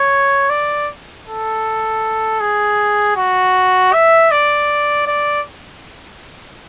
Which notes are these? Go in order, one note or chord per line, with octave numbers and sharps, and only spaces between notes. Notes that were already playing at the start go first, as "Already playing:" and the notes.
Already playing: C#5
D5
A4
G#4
F#4
E5
D5
D5